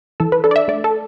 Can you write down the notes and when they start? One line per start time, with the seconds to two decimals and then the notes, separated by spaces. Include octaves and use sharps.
0.20 E3 A4
0.32 B4
0.44 D4 A4
0.51 D5
0.56 E5
0.68 A3 D5
0.84 A4